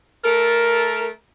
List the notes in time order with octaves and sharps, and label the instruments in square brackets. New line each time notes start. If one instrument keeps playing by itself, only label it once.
[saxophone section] A3 A4 A#4